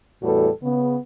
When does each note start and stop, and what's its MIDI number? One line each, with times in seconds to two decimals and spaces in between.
0.22 0.49 40
0.22 0.49 45
0.22 0.49 55
0.22 0.49 66
0.22 0.49 69
0.22 0.49 71
0.62 0.96 49
0.62 0.96 59